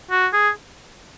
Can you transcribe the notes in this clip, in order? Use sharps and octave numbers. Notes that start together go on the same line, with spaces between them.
F#4
G#4